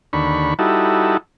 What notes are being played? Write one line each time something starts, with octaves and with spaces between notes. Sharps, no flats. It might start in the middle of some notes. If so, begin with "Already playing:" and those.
D#2 D3 B5 C#6
G3 D#4 E4 F#4 A4